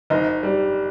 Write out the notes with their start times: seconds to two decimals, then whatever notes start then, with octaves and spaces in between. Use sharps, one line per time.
0.10 F#1 D#4
0.43 G3